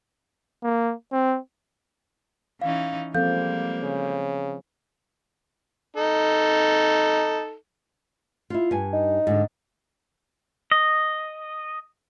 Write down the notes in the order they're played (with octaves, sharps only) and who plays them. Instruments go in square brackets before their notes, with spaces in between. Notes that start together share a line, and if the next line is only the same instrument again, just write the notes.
[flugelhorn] A#3
C4
[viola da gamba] E3 C#4 D#4 [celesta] F5
[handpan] F3 C4 [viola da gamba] G3 G#3 A#3 [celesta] A4 F5 G6
[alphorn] C#3
[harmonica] D#4 A4
[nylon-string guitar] E4 F4
G2 G#5
[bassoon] D#4
[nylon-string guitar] G#2 D3
[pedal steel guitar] D#5